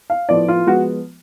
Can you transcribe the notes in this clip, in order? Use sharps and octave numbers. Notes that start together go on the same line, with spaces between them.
F5
A2 F3 B3 D5
F4
F3 G#3 B3 F#4